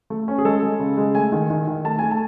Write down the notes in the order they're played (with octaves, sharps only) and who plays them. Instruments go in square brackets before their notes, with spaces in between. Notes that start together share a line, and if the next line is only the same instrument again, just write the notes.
[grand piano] A3
C#4
G#4
G#3 A4
G#3
C#3
G#3
A3 G#5
D#3
D#3
D#3
A3 A5
A3 G#5
A5